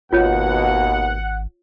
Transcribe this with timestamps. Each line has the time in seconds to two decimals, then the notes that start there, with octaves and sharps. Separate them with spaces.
0.13 G#1 D#2 B2 F4 C#5 F#5